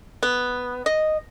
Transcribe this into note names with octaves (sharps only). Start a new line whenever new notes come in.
B3
D#5